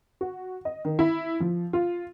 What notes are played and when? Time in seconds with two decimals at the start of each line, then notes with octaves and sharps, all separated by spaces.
0.21 F#4
0.65 D#5
0.85 D#3
0.99 E4
1.40 F3
1.73 F4